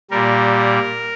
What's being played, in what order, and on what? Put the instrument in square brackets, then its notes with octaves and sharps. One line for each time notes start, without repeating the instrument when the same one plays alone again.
[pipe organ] A#2 G3 A#4